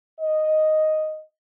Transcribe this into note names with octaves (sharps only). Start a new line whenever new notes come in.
D#5